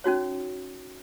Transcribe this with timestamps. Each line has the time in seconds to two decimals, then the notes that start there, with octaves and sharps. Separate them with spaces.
0.04 C#4 D#4 F#4 C#5